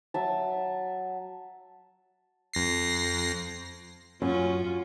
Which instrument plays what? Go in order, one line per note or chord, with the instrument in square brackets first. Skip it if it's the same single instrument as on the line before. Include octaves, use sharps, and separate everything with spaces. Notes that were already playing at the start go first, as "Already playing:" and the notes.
[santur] F#3 E5 A5
[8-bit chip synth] F2 A#6 C7
[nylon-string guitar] F#2 [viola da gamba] C#4 F4